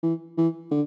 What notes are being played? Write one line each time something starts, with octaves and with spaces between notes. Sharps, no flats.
E3
E3
D3